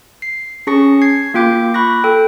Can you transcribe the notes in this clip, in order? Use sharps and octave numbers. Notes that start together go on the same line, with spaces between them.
C7
C#4 G#4 A5 C#6 A#6 C#7
G#6 C7
A#3 F4 G5 D6 G6
B5 C#6 F#6 A#6
A4 G5